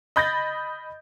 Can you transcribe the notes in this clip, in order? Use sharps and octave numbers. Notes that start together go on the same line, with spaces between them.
D#5 B5 G6 A6 A#6